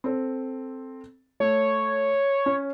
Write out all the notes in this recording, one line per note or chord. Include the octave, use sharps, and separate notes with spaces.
C4 A4
A3 C#5
C#4